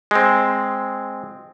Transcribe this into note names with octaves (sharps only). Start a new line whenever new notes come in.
G#3 C4